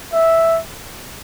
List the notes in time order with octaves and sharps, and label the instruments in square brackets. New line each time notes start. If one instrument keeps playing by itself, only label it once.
[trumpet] E5